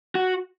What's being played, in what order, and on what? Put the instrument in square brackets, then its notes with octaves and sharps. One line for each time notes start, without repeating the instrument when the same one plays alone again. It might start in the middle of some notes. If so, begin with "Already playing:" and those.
[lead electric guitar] F#4